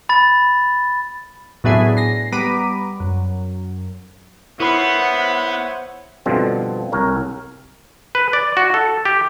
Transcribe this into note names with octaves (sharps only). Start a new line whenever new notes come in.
B5 A6
A2 F#3 B3 D4 E4 G#4
A#6 C7
G3 B3 A#5 B5 D6 D#7
F#2
B3 E4 C5 C#5 E5 F#5 B5 C7
G2 B2 D3 F3 C4
C2 A#4 C#5
B4
D5
F#4
A4
G4